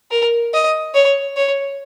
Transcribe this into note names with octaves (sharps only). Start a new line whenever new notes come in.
A#4
D#5
C#5
C#5